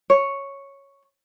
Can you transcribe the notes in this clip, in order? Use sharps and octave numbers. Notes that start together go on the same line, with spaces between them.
C#5